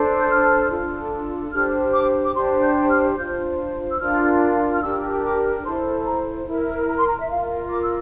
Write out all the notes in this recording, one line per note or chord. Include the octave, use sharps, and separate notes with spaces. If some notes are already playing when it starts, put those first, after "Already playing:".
Already playing: D4 A4 C5
G6
F6
D4 F4 A4
D4 G4 C5 F6
D6
D6
D4 G4 C5 C6
G6
F6
D4 F4 C5 G6
E6
D4 F4 A#4 F6
F6
D4 G4 A#4 E6
D6
E4 A4 C5 C6
A#5
E4 A#4
A#5
C6
A#5
E5
F4 A#4 F5
D6
E6